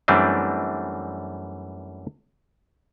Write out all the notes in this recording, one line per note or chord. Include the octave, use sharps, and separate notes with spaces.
F#2 E3 G3 A3 C4 D4